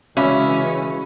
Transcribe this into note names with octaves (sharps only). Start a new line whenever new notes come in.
C#3 E3 G#3 C#4 F#4 E5 F5 B5